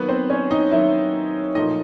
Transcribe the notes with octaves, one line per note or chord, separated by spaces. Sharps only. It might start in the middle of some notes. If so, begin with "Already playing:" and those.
Already playing: D#3 F#3 A#3 B3 B4
C4 C5
C#4 C#5
D#4 D#5
D#3 F#3 A#3 E4 E5
A#2 F3 A3 D#4 D#5